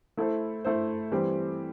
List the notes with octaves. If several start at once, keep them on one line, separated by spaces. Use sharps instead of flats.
A3 E4 A4 C5
A3 E4 A4 C5
E3 G3 C4 G4 C5